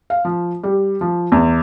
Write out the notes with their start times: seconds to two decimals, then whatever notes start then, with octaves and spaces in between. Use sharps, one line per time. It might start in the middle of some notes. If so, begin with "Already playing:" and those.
0.10 F5
0.25 F3
0.64 G3
1.01 F3
1.32 E2